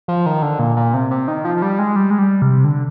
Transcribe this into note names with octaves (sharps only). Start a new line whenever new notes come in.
F3
D#3
D3
A#2
A#2
C3
C3
D#3
F3
F3
G3
G#3
G3
G#3
G3
C3
D3